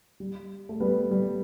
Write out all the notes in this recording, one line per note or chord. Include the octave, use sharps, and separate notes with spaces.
G3
A3
G3 B3
G3